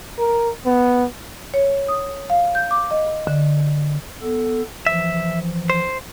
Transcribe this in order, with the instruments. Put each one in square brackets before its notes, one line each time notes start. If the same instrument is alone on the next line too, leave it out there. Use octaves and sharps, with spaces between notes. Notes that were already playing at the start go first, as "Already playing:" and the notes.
[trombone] A#4
B3
[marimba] C#5
D#6
F5
G6
D6
D#5
D3
[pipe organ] B3 A4
[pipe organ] E3 F3 [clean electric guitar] E5
[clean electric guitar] C5